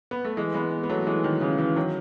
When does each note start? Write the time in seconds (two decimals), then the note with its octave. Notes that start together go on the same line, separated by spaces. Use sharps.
0.11 B3
0.25 A3
0.37 E3 G#3
0.54 G#3 B3
0.83 B3
0.89 F#3 A3
1.07 E3 G#3
1.24 D#3 F#3
1.41 C#3 E3
1.58 C#3 E3
1.76 D#3 F#3